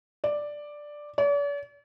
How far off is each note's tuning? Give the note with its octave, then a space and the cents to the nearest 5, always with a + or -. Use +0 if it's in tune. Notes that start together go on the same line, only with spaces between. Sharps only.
D5 +5
D5 -45